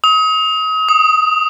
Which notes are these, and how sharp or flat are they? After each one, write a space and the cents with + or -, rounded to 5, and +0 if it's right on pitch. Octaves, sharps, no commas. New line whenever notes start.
D#6 +35
D#6 +5